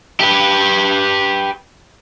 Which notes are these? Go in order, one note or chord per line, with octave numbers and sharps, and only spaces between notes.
G4 B4